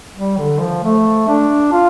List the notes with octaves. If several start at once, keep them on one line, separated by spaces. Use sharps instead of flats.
G3
D3
F3
A3
D4
F4